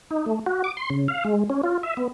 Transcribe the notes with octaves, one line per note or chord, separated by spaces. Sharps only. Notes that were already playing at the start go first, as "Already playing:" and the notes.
D#4
A3
F#4
D6
C6
C#3
F5
G#3
C#4
F4
E5
B3